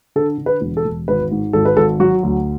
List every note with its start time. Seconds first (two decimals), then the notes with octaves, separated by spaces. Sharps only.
0.16 D3 A4
0.38 D3
0.46 B4
0.61 E1
0.77 A4
0.85 E1
1.08 G#1 B4
1.31 G#2
1.53 G#1 A4
1.65 B4
1.76 G#1 A4
2.00 F#3 F#4
2.23 D2